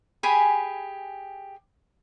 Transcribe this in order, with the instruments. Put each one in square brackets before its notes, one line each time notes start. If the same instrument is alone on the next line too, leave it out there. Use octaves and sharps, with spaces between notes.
[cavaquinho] G4 G#4 G#5 B5